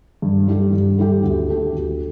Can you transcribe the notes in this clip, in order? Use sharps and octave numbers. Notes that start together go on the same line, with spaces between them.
G2
D3 G3 E4 G4
G2
D3 G3 E4 G4
D2
D3 A3 G4
D2